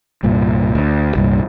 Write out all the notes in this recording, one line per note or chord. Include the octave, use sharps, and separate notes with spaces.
C2 G2 A#2
D2
C2 G2 A#2